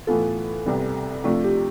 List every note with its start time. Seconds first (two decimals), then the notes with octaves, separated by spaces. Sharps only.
0.07 A2 E3 B3 F4 A4
0.66 C2 C3 G3 B3
1.24 C3 F3 A3 D4
1.44 G4